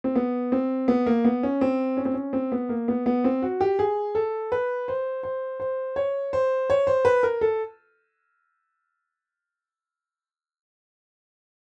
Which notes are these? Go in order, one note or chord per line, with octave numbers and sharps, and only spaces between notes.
C4
B3
C4
B3
A#3
B3
C#4
C4
C#4
C4
C#4
C4
B3
A#3
B3
B3
C4
F#4
G4
G#4
A4
B4
C5
C5
C5
C#5
C5
C#5
C5
B4
A#4
A4